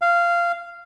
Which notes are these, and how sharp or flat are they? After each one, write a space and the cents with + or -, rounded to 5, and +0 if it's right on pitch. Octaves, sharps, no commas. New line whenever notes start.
F5 -15